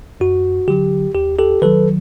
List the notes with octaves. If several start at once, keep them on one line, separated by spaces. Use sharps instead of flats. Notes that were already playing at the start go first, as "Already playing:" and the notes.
F#2 F#4
D3 F#3 G4
D#2 G4
G4 A4
D#3 F#3 A4 B4